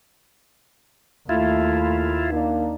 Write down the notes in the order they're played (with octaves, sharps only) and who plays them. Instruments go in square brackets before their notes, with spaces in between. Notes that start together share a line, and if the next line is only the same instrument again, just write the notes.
[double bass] D#2 [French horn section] A3 [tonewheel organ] E4 F4
[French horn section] A#3 D4 D#4